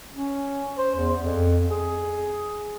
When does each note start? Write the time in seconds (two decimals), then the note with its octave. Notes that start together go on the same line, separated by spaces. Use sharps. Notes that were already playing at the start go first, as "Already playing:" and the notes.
0.14 C#4
0.77 C5
0.96 E2
1.20 F2
1.70 G#4